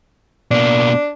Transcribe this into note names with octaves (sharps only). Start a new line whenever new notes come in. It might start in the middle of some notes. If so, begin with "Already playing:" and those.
B2 A#3 D4